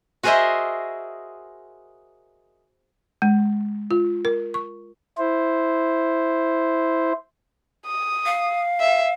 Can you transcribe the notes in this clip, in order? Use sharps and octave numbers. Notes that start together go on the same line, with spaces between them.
F#4 G#4 A#4 C5 D#5 E5
G#3
F4
A#4
C#6
E4 C5
D#6
F5
E5